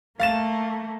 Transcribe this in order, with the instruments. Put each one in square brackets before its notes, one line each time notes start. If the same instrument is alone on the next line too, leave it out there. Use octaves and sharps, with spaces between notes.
[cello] A3 A#3 [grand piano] F5 A6 E7